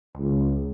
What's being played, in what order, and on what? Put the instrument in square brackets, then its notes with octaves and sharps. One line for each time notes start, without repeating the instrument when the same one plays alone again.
[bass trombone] C#2